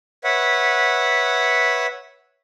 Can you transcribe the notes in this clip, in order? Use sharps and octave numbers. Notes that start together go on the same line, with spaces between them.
B4 C#5 E5 F#5